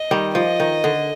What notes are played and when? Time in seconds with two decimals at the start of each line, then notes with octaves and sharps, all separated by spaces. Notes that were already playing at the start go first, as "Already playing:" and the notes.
Already playing: D#5
0.11 D#3 G3
0.35 F3 D#5
0.60 D#3
0.84 D3